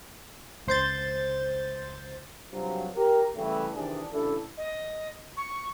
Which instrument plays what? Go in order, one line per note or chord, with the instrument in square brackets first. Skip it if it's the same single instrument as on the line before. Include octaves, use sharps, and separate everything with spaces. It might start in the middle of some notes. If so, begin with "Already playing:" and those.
[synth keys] C#2 C5 G6 A6
[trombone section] G2 C3 F3 F#3
G4 A#4
C#3 E3 G3 A3
C3 D#3 E3 D4 G#4
A1 C#3 D4 E4 A4
[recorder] D#5
C#6